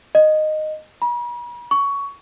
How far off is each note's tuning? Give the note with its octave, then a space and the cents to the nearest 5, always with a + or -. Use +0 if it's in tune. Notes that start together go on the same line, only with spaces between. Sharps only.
D#5 -10
B5 -45
C#6 +15